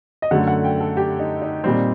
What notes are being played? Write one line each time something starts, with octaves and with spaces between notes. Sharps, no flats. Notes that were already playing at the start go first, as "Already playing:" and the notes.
D#5
F#2 D3 A3 F#5
F#5
G5
A4
G4
D#4
D#4
A#2 G3 C4